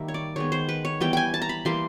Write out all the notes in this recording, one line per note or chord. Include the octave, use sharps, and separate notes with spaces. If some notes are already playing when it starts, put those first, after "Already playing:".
Already playing: D#3 G3 A#3 E5
C#5
D5
D#3 G#3 B3 C#5
C5
B4
C#5
E3 G3 B3 G5
G5 G#5
A5
A#5
B5
E3 G3 A#3 C6